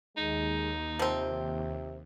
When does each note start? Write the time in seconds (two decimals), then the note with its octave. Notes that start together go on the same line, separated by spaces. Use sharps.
0.17 D#2 G#3 D#4
0.99 C3 F3 C4